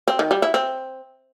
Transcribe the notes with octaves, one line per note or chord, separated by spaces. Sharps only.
C4
D#3
G3
E4
C4